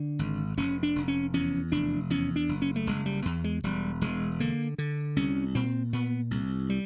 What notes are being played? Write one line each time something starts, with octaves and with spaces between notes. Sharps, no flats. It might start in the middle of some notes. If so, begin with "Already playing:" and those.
Already playing: D3
G#1
F1 C#4
D4
F1
C#4
E2 C#4
F1 D4
E2 C#4
D4
F#1
C#4
A3
F#1 G#3
G3
E2
G#3
E1 G3
E1 G#3
D3 A#3
D3
C2 C#4
A#2 C4
A#2 B3
C2
G3